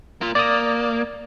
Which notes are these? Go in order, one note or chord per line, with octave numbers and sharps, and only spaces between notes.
A#3 F4
A#3 D5 D#6